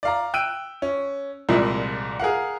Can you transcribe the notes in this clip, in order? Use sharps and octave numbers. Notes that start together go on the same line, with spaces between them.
D5 F5 A#5
G5 E6 F#6 D7 D#7
C#4
C2 A#2 F3 G3 G#3 E4
G#4 A#4 F5 F#5